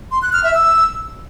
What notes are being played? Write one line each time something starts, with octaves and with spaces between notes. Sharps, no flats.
C6
F#6
F6
E5
E6